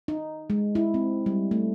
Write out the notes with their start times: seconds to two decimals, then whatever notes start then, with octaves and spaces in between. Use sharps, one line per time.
0.08 D#4
0.50 G#3
0.75 E4
0.94 C4
1.26 G3
1.51 A3